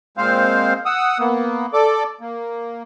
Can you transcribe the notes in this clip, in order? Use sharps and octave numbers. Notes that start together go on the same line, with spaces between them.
A#2 G#3 C4 C5 F5
F#5 D#6 E6
A#3 B3
A4 D5 D6
A#3